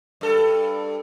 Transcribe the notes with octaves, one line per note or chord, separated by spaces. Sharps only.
G2 A4